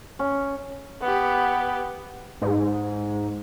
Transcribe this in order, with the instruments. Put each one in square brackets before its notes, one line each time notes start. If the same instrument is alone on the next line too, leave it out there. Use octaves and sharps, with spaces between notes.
[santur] C#4
[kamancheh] B3 G4
[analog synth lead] G#2